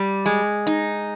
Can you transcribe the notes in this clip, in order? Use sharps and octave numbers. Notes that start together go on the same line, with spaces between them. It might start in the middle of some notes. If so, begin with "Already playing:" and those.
Already playing: G3
G#3
D#4